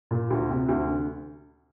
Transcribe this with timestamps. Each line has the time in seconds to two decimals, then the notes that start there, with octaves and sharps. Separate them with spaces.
0.11 A#2
0.30 D2
0.49 C3
0.69 D2
0.87 D3